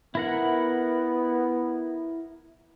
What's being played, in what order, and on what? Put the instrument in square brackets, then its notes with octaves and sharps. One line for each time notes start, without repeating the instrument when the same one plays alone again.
[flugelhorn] B3 [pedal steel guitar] E4 A#4 F#5